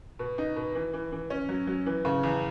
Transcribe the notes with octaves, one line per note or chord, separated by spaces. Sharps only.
B2
D#4
B2
E3
E3
E3
C#4
F#3
F#3
E3
C#3
E2